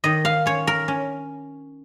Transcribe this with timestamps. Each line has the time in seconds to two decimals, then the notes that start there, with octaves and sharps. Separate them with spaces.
0.04 D#3 D#5
0.25 F5
0.46 C#4 C#5
0.67 A#4
0.88 C#4